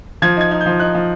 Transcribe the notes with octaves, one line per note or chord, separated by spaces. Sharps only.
F3 G#6
D#4 G#6
D#4
G6
F3
D#4 F#6
F3